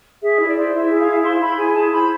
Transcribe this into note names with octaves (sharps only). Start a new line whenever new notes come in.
G#4 E5
E4
D5
C5
E4 E5
G#4
F5
E4
C5 C6
E4 B5
G#4 G#5
E4 A5
C5 B5